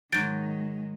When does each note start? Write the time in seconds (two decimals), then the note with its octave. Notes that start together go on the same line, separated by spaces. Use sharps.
0.12 G#2 D#3 F#3 G#3 G6 A6 D7